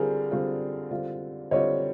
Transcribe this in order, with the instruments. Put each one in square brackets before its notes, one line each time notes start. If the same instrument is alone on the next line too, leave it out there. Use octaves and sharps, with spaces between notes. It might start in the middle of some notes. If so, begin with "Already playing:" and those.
Already playing: [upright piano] D3 G3 C4 F4 [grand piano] G#4 A#4
[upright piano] D3 G3 C4 F4
D3 G3 C4 F4
[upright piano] D3 G3 C4 F4 [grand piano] C#5 D#5